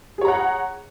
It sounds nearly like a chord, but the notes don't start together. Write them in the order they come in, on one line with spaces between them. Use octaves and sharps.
G#4 C#5 A#5 F#5